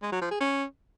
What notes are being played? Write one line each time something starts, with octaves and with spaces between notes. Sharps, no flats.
G#3
F#3
F3
G#4
C#4